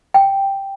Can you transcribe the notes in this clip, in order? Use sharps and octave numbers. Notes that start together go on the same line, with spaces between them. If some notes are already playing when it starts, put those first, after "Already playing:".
G5